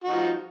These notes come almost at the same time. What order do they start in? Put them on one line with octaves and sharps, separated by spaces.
F#4 D#4 F3